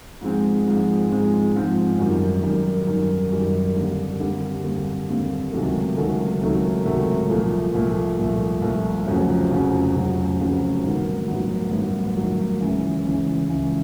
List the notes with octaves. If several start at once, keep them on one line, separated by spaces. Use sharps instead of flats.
G#2 F3 G#3 C4
G#2 F3 G#3 C4
G#2 F3 G#3 C4
G#2 F3 G#3 C4
F#2 D#3 G3
F#2 D#3 G3
F#2 D#3 G3
F#2 D#3 G3
D#2 D3 G3 C4
D#2 D3 G3 C4
D#2 D3 G3 C4
D#2 D3 G3 C4
C#2 C3 D#3 F#3 A3
C#2 C3 D#3 F#3 A3
C#2 C3 D#3 F#3 A3
C#2 C3 D#3 F#3 A3
C2 A#2 F3 A3
C2 A#2 F3 A3
C2 A#2 F3 A3
C2 A#2 F3 A3
F1 F2 C#3 F#3
F1 F2 C#3 F#3
F1 F2 C#3 F#3
F1 F2 C#3 F#3
A1 G2 D#3 F#3 B3
A1 G2 D#3 F#3 B3
A1 G2 D#3 F#3 B3
A1 G2 D#3 F#3 B3
C#2 C#3 E3
C#2 C#3 E3
C#2 C#3 E3